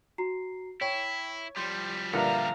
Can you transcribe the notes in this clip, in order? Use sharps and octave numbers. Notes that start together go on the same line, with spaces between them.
F#4 A#5 C7
E4 C#5 G5
F3 G3 C6 G6
G2 A#2 D3 E5 F5 A#5 C#7